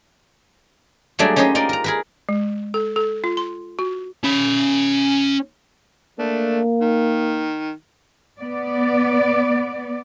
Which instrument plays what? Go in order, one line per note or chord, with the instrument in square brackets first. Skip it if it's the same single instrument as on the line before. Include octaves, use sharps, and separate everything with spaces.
[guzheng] F#3 G3 A3 A#3 D4 G#4
C#4 D#4 G4 C5 C#5 D#5
D#4 F4 A#4 D5
A#4 A#5
G#4 A#4 B4
[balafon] G#3
A4
A4
F4
C6
F#4
[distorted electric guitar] C#4 B5
[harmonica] A3 D4 [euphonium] A#3
[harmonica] D#3
[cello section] B3 D5